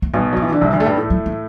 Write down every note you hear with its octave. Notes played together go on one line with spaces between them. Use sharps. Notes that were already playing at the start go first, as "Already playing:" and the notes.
A3
B1 B2 G3
F#3 A3
E3
D3
C2 C3 G3
D2 D3
A3
G2 G3
A2 A3
F#3
F#3